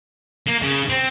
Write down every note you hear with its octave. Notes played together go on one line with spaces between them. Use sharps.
A#3
C#3
C4